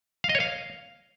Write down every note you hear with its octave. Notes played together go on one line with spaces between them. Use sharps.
F5
D#5
C#5
F5